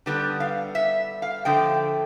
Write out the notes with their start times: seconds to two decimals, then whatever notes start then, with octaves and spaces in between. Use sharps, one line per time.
0.06 D3 G3 B3 D4
0.40 F5
0.75 E5
1.22 F5
1.45 D3 F3 A3 G5